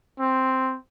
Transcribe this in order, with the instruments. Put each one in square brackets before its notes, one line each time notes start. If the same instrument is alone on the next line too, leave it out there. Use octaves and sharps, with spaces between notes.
[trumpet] C4